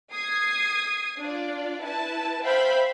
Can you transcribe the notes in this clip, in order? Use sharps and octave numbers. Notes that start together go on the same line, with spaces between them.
D#6 G#6 C7
D4 F4 D5
E4 B4 A5
C5 E5 F5 G5 B5